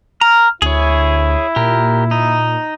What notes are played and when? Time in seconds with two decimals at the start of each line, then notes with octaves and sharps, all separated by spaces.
0.21 A#5 F6
0.62 D2 E4 G#4 C#5
1.56 A#2 G4 A#4
2.11 D#4